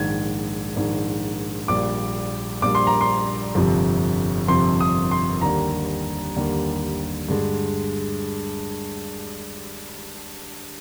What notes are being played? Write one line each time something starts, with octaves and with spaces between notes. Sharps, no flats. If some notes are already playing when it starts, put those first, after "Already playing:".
Already playing: A#1 G#2 D#3 G#6
A#1 G#2 D#3
A#1 A#2 G3 A#3 D6
A#1 A#2 G3 A#3 D6
C6
A#5
C6
G1 F2 C3 F3
G1 F2 C3 F3 C6
D#6
C6
D#2 D3 G3 A#3 A#5
D#2 D3 G3 A#3
G2 D3 G#3